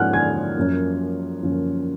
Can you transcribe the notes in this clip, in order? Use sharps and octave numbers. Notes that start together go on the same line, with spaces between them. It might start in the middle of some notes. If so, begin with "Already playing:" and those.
Already playing: G#2 F3 A#3 C#4 F#5 G#5 F6 F#6
G#5 G#6
F#2 F3 A#3 C#4
F#2 F3 A#3 C#4